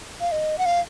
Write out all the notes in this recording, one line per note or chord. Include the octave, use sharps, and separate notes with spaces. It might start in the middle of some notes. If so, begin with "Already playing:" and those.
F5
D#5
F#5
F5